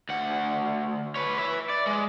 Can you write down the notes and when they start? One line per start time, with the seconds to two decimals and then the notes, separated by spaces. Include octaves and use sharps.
0.09 D2 F#5
1.16 B4 C#5
1.38 B4 E5
1.69 D5
1.87 G#3